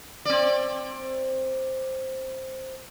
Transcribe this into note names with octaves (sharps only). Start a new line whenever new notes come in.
C4 D5